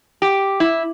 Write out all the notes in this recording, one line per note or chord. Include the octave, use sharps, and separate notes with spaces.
G4
E4